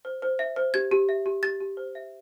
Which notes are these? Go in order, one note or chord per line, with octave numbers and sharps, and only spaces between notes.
C5
C5
E5
C5
G4 G#6
G4
E5
G4
G4 A6
G4
C5
E5